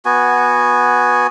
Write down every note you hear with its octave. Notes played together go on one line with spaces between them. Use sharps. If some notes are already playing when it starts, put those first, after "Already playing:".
B3 F#4 G#5